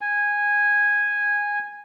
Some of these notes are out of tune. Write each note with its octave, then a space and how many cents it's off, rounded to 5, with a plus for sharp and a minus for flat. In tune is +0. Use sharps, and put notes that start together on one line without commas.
G#5 -10